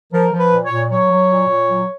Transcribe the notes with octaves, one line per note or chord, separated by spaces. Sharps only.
F3 A#4
F3
B4
A#2
C#5
A#2
F#3 C#5
F#3
A#2
A#2
F#3